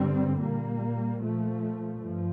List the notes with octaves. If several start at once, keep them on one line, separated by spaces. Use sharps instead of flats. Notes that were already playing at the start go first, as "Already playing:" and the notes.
Already playing: G2 D3 G3 C4
A#2 G3 A#3
A#2 F3 A3
G2 F3